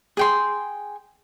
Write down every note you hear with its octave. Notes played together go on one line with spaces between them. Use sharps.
G#4 G5 C6